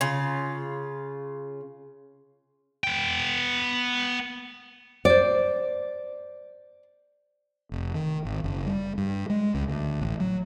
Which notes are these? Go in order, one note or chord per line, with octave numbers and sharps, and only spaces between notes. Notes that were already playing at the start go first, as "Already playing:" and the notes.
C#3 F4
B3 G5
C5 D5
F1
D#3
G#1
F#1
G3
G2
G#3
C#2
D2
A1
F#3